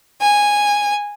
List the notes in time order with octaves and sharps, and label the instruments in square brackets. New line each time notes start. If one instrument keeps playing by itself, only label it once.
[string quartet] G#5